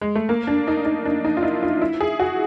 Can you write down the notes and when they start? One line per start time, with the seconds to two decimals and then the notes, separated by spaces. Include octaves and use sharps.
0.01 G#3
0.15 A3
0.29 A#3
0.47 D4
0.67 D#4
0.85 D#4
1.05 D4
1.25 D#4
1.37 F4
1.43 E4
1.63 F4
1.82 E4
2.01 G#4
2.20 F#4